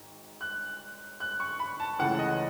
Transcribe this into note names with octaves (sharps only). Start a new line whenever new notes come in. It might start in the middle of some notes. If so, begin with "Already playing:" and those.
Already playing: G#1 G#2 D#3
F#6
F#6
C#6
B5
A5
C#2 C#3 E3 A3 F#5
D#5